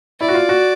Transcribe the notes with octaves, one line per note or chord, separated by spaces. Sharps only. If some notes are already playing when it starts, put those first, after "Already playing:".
E4 D5
F#4
F4
F#4